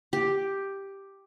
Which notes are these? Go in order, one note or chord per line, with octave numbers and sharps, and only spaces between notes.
G4